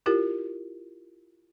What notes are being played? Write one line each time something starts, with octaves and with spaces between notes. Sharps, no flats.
E4 F4 G4 A#4